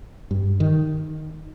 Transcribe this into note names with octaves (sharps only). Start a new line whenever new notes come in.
G2
D#3